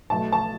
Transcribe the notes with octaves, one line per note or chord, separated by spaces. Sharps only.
B1 B2 A3 A5
A5